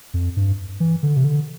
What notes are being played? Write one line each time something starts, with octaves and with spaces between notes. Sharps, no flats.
F2
G2
E3
D3
C3
D3